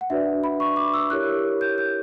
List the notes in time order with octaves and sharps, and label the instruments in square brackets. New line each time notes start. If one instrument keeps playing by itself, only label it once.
[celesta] F#5
D4 F#4 B4 D5 E5
B5
C#6
D6
E6
E4 G4 A#4 C#5 F#6
G6
G6